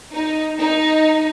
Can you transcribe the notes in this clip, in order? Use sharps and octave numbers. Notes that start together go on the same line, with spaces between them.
D#4
D#4